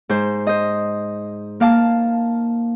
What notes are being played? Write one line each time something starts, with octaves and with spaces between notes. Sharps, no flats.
G#2 C5
C5 D#5
A#3 F5 A5